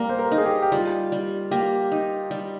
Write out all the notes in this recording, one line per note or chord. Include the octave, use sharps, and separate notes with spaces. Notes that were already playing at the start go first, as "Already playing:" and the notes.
Already playing: G3 A#3 G4 A#4
C5
A#4
D#4
G#4
G4
G4
G3 F4
G3
A#3 G4
D#4
G3